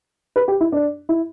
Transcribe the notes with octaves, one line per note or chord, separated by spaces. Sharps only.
B4
G4
E4
D4
E4